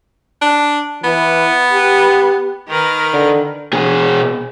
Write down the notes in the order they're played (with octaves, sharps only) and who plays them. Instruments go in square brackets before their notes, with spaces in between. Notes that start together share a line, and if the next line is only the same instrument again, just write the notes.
[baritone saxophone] D4
[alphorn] E3 [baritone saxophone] B3
[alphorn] G4
[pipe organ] D#3 [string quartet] A#4 B4 F6
[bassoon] D3
[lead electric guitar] B2 G#4